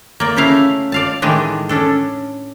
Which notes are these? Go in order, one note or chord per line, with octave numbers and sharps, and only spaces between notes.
A#3 D5
C#3 A3 E4 F5 A#5
D5 F5 A5
A2 D#3 E3 G#3 D4
C#4 D4 A4